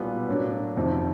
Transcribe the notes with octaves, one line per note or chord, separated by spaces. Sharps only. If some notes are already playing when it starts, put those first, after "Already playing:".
Already playing: B1 A#2 G3 B3
A2 F#3 A#3 D4
F1 F2 C3 D#3